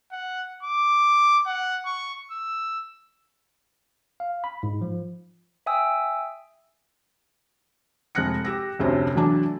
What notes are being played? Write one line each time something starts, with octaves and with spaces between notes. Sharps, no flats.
F#5
D6
F#5
C#6
E6
F5
B5
G#2
F3
E5 G5 G#5 D#6 E6
F1 G#3 F#6 A#6 C#7
G4 E6 A#6
F1 D2 C3 C#4
E2 F#3 A3 D4 A5